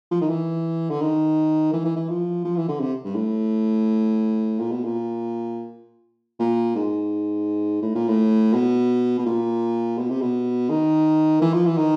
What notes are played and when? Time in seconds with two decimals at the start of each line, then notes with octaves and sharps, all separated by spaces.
0.11 F3
0.21 D#3
0.29 E3
0.90 D3
1.01 D#3
1.73 E3
1.85 E3
1.96 E3
2.09 F3
2.44 F3
2.57 E3
2.69 D3
2.80 C3
3.05 G2
3.16 A2
4.59 A#2
4.71 B2
4.84 A#2
6.40 A#2
6.75 G#2
7.82 A2
7.95 A#2
8.08 A2
8.54 B2
9.19 B2
9.26 A#2
9.98 B2
10.10 C3
10.21 B2
10.69 D#3
11.42 E3
11.53 F3
11.66 E3
11.78 D#3